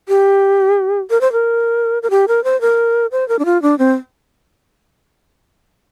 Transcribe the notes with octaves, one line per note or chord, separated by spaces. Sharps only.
G4
A#4
C5
A#4
A#4
G4
A#4
C5
A#4
C5
A#4
D4
F4
D4
C4